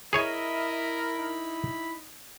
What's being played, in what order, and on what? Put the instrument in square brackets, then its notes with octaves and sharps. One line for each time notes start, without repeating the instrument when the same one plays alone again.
[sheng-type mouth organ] E4 B5 [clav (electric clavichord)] G#4 C#5 G#5 [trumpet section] A#4 [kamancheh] D#5 E5
[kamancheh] D#4